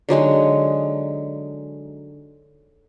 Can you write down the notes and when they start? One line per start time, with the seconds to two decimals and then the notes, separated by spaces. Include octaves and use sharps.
0.09 D3 F#3 G#3 D#4